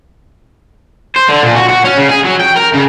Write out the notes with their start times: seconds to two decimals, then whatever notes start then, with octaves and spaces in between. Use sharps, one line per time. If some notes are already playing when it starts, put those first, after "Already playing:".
1.16 C5
1.29 D3
1.44 A#2
1.56 F#4
1.70 F#4
1.85 C#4
1.98 C#3
2.10 G#4
2.25 F#3
2.40 G5
2.56 A#4
2.73 C#3